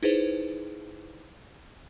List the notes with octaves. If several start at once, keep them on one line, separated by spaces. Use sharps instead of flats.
D#4 E4 G#4 B4 C5